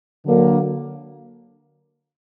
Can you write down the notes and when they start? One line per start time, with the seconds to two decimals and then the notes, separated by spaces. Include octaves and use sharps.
0.26 D3 F#3 A#3